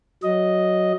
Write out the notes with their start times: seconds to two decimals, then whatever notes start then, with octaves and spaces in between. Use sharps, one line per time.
0.23 F#3 D#5